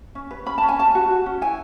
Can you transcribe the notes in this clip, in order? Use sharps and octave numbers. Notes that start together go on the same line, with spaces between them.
C#4
B4
C#4 B5
A5
C#4
G#5
C#4 A5
F#4
F#4
C#4
E4 G#5